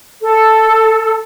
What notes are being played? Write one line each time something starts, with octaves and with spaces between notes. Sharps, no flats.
A4